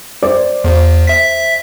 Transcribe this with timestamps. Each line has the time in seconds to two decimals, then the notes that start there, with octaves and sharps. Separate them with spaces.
0.23 C5 D5 D6
0.64 E2 C5
1.07 E5 B6